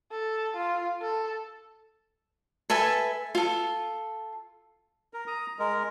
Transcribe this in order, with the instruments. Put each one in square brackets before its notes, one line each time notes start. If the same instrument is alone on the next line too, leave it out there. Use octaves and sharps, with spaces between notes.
[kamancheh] A4
F4
A4
[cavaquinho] A4 B4 E5 G#5
F4 A4
[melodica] A#4
A#5 D#6
G#3 A#4